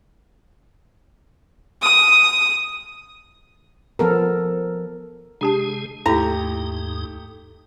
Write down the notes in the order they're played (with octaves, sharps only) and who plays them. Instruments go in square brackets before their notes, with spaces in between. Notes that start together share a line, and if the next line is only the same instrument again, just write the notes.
[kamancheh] D#6
[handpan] F3 B3 A4 A#4
[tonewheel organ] C3 G#3 G#4 [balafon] D4 G4 A5
[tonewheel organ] D#2 G#2 D#4 [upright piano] A3 G4 [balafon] E4 [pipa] A#5